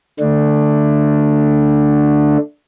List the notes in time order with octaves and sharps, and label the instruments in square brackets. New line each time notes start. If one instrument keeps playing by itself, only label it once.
[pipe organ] D3 A3 D4